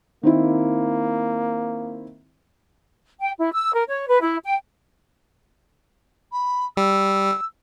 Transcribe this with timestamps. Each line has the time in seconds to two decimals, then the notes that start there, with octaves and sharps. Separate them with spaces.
0.23 D#3 A#3 C4 E4
3.20 G5
3.38 E4
3.52 E6
3.73 A#4
3.87 C#5
4.07 B4
4.21 E4
4.44 G5
6.32 B5
6.77 G3 E6